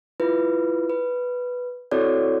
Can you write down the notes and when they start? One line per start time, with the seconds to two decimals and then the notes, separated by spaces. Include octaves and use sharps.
0.20 E4 F4 B4
0.90 B4
1.91 C4 E4 F#4 A4 C#5 D5